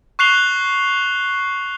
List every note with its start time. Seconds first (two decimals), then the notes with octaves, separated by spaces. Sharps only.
0.19 C#6 F#6 C7 F7 G7